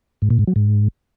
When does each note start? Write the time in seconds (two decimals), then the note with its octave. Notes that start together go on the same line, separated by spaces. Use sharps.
0.22 G#2
0.30 A#2
0.39 G#2
0.47 F#3
0.56 G#2